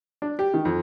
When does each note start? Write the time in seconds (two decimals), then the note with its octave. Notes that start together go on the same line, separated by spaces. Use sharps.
0.22 D4
0.39 G4
0.54 D#3
0.65 F2